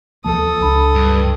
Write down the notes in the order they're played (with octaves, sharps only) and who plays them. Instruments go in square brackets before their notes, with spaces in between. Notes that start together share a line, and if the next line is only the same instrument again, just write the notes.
[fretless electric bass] D#2 F3 A#3 [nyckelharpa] A4 D#6 [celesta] A5
[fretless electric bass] C#2 D4 [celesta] A5 B5
[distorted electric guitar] G2